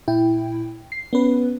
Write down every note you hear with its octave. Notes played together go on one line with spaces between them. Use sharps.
A#2 E4 G5
C7
B3 C#4 B4